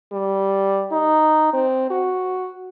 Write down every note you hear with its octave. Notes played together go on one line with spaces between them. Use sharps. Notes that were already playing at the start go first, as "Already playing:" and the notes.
G3
D#4
C4
F#4